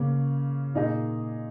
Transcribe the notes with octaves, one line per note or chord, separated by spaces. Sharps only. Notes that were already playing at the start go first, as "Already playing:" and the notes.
Already playing: C#3 A#3 C#4
A#2 A#3 D#4 G#4 D#5